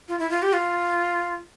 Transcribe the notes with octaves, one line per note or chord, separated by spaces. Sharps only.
F4
E4
F4
G4
F4